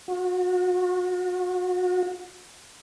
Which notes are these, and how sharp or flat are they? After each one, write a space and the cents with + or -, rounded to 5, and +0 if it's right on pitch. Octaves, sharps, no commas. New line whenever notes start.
F#4 -35